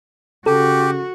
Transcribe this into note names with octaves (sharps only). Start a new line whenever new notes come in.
C#3 F#4 G4 A4